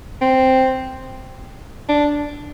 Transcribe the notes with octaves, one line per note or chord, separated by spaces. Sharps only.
C4
D4